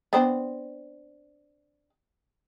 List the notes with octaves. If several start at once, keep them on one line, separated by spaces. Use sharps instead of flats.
B3 C4 D4